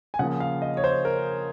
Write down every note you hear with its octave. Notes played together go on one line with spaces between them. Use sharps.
G#5
C#3 F3 A#3 F#5
F5
D#5
C#5
C5
A#4